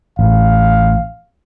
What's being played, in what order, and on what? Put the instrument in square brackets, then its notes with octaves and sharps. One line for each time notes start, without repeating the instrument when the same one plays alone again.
[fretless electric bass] A1 [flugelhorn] F5